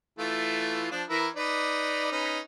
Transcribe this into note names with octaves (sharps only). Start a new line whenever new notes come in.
E3 A3 F4
F3 D4
E3 E4 A#4
D#4 B4 D5
C#4 D#4 B4